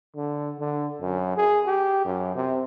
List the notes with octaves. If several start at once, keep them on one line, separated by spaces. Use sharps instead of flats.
D3
D3
F#2
G#4
G4
F#2
C3